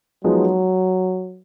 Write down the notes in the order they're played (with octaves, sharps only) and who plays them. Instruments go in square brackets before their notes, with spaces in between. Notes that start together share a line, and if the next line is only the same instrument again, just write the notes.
[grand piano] F3 G#3 B3 D#4 [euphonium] F#3